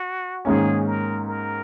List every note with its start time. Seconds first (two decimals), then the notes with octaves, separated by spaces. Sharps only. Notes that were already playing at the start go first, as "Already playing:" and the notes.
Already playing: F#4
0.45 G#2 D#3 A#3 C#4 G#4
0.87 A#4
1.28 A#4